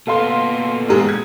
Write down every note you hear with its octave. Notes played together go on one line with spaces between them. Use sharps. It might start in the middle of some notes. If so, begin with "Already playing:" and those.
A#2 B3 A4 F5 C6
E1 G#3
G#6